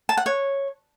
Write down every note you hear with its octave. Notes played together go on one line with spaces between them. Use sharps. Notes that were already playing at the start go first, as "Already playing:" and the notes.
A5
F#5
C#5